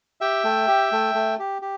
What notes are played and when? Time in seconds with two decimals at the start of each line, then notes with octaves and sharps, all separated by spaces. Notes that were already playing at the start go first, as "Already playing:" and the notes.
0.21 G4 E5 G5
0.44 A3
0.68 G4
0.92 A3
1.15 A3
1.39 G4
1.62 G4